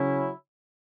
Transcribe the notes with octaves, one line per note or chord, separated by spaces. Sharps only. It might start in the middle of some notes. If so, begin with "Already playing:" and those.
Already playing: C#3 F#3 C#4 E4